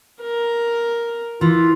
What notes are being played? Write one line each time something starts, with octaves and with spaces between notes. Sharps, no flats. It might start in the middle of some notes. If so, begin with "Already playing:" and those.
A#4
E3 F4